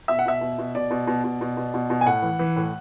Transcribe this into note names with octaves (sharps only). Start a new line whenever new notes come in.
B2 E5
F#5
B2 E5
B2
B2
B2 D5
B2
B2
B2
B2
B2
B2
B2
G#5
A2 F#5
E3
E3
A2